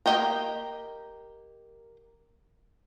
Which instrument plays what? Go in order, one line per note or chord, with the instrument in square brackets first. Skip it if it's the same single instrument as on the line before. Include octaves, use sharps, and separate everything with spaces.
[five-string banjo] A#3 G4 D#5 G5 A#5